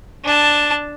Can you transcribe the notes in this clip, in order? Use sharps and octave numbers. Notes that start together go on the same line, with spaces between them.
D4 A5